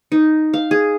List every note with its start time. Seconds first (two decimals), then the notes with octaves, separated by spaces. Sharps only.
0.12 D#4
0.53 F5
0.71 G#4